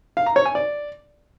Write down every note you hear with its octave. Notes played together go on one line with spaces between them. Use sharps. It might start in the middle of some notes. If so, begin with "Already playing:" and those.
F5
A#5
C#5
G#5
D5